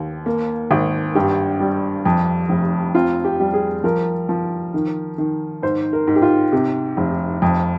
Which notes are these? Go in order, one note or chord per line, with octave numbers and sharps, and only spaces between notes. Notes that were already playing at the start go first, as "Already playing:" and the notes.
Already playing: D#2
A#3
G#1
G2 G4
G3
F2
F1
C4 F4
G4
G3
G#4
F3 A#4
F3
D#3
D#3
G#2 C5
A#4
G#2
G4
F4
C3 G4
F1
F2